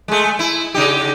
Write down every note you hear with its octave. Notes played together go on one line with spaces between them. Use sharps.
G#3 A3
E4
C#3 D#4 G4